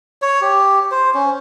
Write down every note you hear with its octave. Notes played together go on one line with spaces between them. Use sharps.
C#5
G4
C5
C#4